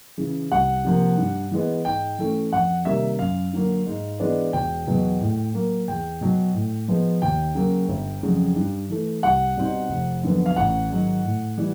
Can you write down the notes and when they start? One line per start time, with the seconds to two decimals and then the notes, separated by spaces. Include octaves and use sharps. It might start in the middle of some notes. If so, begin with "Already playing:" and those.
0.18 C#3 E3
0.52 C2 F#5
0.85 C3 F3 A#3
1.17 G2
1.51 E3 G#3 B3
1.85 G#2 G5
2.19 E3 A3 C#4
2.52 F2 F#5
2.85 C3 D#3 G3 A#3 E5
3.19 F#2 F5
3.53 D3 F#3 A#3
3.86 G#2
4.20 E3 G#3 B3 D4
4.53 E1 G5
4.87 E2 B2 F#3 B3
5.20 A2
5.54 F#3 A#3
5.88 E2 G5
6.21 B2 F#3
6.54 A2
6.88 F3 G#3 B3
7.22 D#2 G5
7.55 C#3 F#3 A#3
7.89 G1
8.23 F2 C#3 F#3
8.56 G2
8.90 E3 A3
9.23 C2 F#5
9.57 B2 G3 C4 D#4
9.89 F1
10.23 F2 D3 F#3 B3
10.46 F5
10.56 A1 F#5
10.90 G#2 D#3 F#3
11.24 A2
11.58 E3 G3